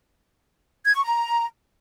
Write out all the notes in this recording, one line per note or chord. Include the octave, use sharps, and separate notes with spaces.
G#6
C#6
A#5